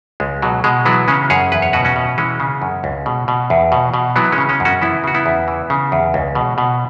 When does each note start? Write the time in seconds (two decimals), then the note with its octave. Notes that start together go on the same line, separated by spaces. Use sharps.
0.20 C#2 G#3
0.42 B2 F#3
0.64 B2 G#3
0.85 E3 F#3 B3
1.08 C#3 G#3 C#4
1.30 F#2 G#4 C#5
1.52 E2 B4
1.62 C#5
1.73 B2 F#4 B4
1.85 C#4 F#4
1.96 B2
2.18 E3 G#3 C#4
2.40 C#3
2.62 F#2
2.84 C#2
3.06 B2
3.28 B2
3.50 E2
3.72 B2
3.94 B2
4.16 E3 F#3 B3
4.32 G#3 C#4
4.38 C#3
4.49 G#3 C#4
4.60 F#2
4.65 C#4 F#4
4.81 E3 B3 E4
5.04 C#3 F#4
5.14 B3 E4
5.26 E2
5.48 E3
5.70 C#3
5.92 E2
6.14 C#2
6.35 B2
6.58 B2